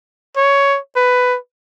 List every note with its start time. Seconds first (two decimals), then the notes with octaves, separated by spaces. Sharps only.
0.37 C#5
0.96 B4